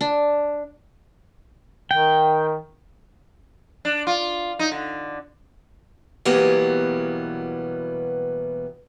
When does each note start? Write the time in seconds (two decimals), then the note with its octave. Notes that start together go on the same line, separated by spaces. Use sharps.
0.01 D4
1.91 D#3 G5
3.85 D4
4.07 F4
4.59 D#4
4.72 D3
6.25 B2 E3 F#3 G3 A#3 B3